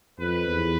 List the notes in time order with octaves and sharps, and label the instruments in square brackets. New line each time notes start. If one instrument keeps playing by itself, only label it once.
[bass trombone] F2 [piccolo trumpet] B4
[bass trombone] E2